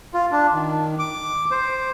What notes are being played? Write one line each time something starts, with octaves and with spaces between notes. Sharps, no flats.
F4
D4
D#3
D6
C5